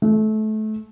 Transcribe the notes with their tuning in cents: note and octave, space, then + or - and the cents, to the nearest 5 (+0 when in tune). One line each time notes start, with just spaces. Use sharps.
A3 -25